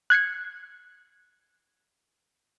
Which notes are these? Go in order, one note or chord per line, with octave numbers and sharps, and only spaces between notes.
F#6 G#6 C7 C#7